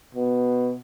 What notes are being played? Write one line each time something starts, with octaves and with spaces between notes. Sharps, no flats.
B2